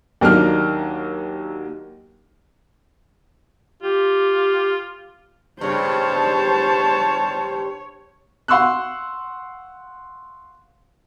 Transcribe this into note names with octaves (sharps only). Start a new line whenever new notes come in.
D#2 F#3 A#3 D4 D#4 F6
F4 G4
G2 C#3 G3 C5 C#5 A5
F5 F#5 C6 C#6 E6 F#6